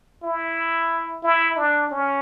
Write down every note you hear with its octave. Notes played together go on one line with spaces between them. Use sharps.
E4
E4
D4
C#4